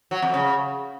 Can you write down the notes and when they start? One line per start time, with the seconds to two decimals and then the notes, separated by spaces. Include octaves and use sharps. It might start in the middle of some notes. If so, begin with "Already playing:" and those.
0.11 F#3
0.22 F2
0.34 C#3